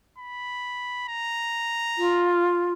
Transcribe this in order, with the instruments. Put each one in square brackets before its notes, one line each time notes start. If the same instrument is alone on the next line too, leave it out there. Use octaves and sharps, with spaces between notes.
[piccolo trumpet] B5
A#5
[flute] F4